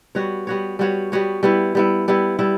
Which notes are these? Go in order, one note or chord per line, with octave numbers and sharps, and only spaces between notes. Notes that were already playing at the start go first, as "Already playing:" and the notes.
G3 B3 F#4 C#5
G3 B3 F#4 C#5
G3 B3 F#4 C#5
G3 B3 F#4 C#5
G3 B3 E4
G3 B3 E4
G3 B3 E4
G3 B3 E4